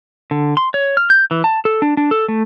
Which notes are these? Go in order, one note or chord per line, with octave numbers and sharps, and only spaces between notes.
D3
C6
C#5
F6
G6
E3
A5
A4
D4
D4
A4
A3